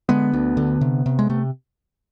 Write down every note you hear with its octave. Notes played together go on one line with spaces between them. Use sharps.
D3 G#3 B3
D2
D3
C3
C3
G#3
C3 A3